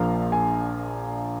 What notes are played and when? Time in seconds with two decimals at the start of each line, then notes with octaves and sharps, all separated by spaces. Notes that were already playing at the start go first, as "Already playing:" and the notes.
Already playing: A#1 A#2 F3 A#3 F5
0.32 G#5